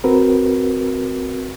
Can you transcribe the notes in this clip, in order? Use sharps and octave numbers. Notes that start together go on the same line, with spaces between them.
C4 F#4 A#4 B4